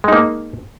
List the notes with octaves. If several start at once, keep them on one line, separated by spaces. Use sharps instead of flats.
G#3 A#3 D#4